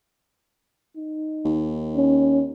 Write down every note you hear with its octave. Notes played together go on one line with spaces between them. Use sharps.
D#4
D#2
C#4